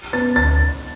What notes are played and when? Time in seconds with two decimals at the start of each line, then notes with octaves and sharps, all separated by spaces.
0.13 B3 A6
0.36 D2 A6